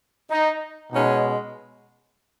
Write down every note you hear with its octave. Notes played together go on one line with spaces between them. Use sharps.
D#4
B2 G#3 C#4 D#4